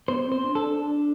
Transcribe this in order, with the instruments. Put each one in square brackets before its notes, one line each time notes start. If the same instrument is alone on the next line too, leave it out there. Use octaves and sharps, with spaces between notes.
[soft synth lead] B3 [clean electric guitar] C5
[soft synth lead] C4
[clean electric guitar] C5
[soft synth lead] D4
[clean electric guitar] A4
[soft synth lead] D4
D4